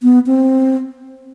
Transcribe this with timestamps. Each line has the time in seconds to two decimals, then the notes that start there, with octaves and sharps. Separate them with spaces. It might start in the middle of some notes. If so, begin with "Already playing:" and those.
0.03 B3
0.27 C4